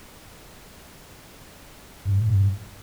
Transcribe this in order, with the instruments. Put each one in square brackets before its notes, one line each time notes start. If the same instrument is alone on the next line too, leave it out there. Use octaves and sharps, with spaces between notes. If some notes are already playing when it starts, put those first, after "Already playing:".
[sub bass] G2
A2
G2